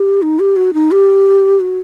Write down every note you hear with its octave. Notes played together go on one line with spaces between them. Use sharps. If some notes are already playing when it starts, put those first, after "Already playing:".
Already playing: G4
D#4
G4
F#4
D#4
G4
F#4